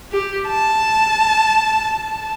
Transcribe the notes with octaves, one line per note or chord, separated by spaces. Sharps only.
G4
A5